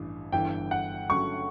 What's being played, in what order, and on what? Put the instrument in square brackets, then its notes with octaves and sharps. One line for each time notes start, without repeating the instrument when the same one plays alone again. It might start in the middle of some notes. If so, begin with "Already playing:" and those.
Already playing: [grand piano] A1 G2 E3
[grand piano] G1 G2 E3 [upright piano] G5
[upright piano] F#5
[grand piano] G2 D3 F#3 A3 C#4 [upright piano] C#6